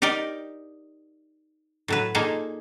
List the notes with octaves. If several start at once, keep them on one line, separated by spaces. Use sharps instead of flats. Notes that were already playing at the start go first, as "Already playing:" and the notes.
D#4 G4 A#4 D5 D#5
A2 F#3 B4
A#2 A#3 D#4 G#4 A4